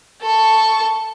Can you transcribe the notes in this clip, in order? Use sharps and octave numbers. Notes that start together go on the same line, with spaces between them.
A4 C#6